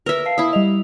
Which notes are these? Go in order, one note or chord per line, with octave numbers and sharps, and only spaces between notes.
A#4 B4 E5 E6
F5 A5 C7
E4 E5 D#6
G3 D#5 F7